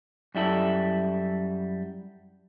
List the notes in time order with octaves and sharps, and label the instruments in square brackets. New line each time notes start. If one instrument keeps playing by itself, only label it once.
[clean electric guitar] F#2 G3 E4 A4